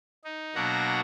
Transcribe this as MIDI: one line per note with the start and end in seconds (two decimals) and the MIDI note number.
0.24 0.55 63
0.55 1.01 47
0.55 1.01 54
0.55 1.01 58
0.55 1.01 62
0.55 1.01 78
0.55 1.01 82